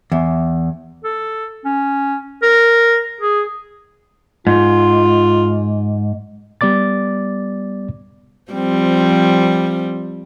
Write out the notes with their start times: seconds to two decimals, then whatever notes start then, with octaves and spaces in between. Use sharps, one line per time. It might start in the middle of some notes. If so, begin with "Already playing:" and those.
0.12 E2
1.04 A4
1.65 C#4
2.43 A#4
3.21 G#4
4.47 G#2 F4
6.61 G3 B3 D5 D6 A6
8.52 F3 G3 C4